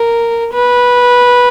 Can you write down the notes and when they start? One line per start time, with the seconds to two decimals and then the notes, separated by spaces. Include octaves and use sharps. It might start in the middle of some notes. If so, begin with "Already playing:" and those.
Already playing: A#4
0.54 B4